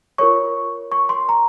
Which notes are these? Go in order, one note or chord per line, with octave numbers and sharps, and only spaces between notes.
F4 A#4 C#5 C#6
C#6
C6
A#5